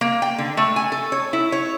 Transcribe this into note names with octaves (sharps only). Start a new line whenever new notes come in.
A#3
G5
D3
A3
G#5
A4
C#5
E4
C#5